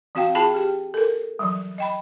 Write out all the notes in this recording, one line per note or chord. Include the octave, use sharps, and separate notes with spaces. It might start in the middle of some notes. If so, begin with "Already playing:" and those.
E3 C4 F#4 F5 G5
F4 G#4 G5 A5 B5
G4 G5
A4 A#4
E3 F#3 G3
D#5 G5 B5